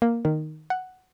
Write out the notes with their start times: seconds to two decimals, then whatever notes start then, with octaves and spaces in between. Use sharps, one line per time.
0.02 A#3
0.25 D#3
0.70 F#5